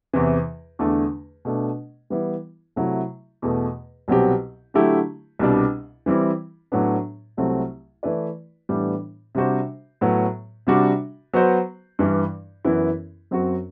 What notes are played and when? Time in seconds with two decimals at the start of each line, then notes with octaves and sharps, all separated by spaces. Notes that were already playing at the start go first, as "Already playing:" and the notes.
0.13 E2 C3 E3
0.79 E2 D3 A3 D4
1.45 B2 A3 D4
2.10 E3 G3 B3 E4
2.76 C3 F#3 A3 E4
3.42 E2 B2 A3
4.08 C2 B2 F#3 C4 G4
4.74 D3 F#3 A3 E4 G4
5.39 C2 B2 G3 D4
6.06 E3 G3 C4 E4
6.72 A2 F#3 B3 D4
7.37 C2 C3 F#3 A3 C4
8.03 E3 A3 E4 B4 D5
8.69 A2 E3 G3 B3 D4
9.35 C3 G3 D4 F#4 C5
10.01 A2 F#3 B3
10.67 C3 G3 D4 F#4
11.33 F#3 B3 F#4 C5
11.99 G2 E3 G3
12.65 F#2 E3 B3 E4
13.31 F#2 F#3 C4 F#4